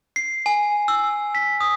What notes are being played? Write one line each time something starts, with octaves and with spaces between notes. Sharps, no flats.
C7
G#5
E6
B6
D#6